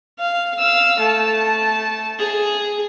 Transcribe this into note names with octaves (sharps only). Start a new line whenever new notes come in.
F5
F5 E6
A3 A5
G#4